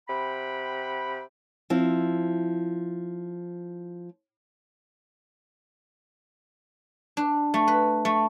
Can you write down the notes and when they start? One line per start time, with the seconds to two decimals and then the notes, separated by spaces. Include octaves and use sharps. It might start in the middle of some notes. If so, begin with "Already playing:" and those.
0.08 C3 F#5 G5 B5
1.70 F3 C4 E4
7.17 D4
7.54 A3
7.68 B4
8.05 A3